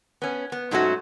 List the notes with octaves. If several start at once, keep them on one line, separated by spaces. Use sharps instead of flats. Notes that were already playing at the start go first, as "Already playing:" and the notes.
B3 C#4
B3
G#2 F#3 A3 C#4 F#4 C#5